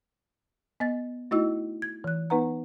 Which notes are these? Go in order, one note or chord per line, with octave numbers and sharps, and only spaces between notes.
B3 D#5 A6
A3 D#4 E4 F#4 D#5 E6
G#6
E3 F#6
B3 D#4 B4 F#5 A#5